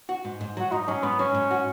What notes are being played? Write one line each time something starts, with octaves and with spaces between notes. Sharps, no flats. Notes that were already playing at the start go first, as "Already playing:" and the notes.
F#4
G#2
G#2
F#3 F#4
G#2 D#4
D#4
F#3 C#4
G#2 B3
F#3 C#4
G#2
F#4